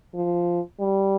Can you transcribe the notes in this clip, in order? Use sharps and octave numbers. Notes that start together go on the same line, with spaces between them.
F3
G3